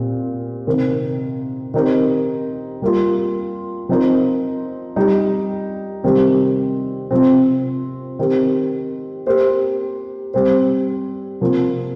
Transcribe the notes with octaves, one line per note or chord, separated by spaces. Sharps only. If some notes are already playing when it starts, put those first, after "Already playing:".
Already playing: A#2 C4 G4
C3 D#3 C4 D#4 A#4
D#3 C4 D#4 G4 A#4
G3 A#3 F4
F3 C4 D#4 A#4
G3 D#4 G4
C3 D#3 G3 C4 G4
C3 F3 C4
D#3 C4 G4
A#3 G4 C5
G3 C4 G4 C5
C3 F3 A#3